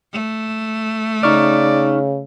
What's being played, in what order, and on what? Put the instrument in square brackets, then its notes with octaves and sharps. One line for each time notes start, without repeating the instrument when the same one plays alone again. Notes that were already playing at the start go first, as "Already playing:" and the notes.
[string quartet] A3
[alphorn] C#3 [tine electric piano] D#4 C#6 F6 [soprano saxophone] D5